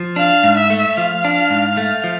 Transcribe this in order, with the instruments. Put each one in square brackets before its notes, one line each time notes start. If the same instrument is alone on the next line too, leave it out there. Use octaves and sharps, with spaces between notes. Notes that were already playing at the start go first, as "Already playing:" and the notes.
Already playing: [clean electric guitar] F3
[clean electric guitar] D4 [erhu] F5
[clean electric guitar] G#2
[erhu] E5
[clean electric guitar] A3
[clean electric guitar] F3 [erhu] F5
[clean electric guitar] D4
G#2
A3
F3